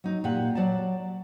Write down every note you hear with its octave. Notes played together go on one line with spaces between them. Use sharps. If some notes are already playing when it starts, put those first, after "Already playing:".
F#3 D#4
A#2 G4 F#5
F#3 D5 F#5 A5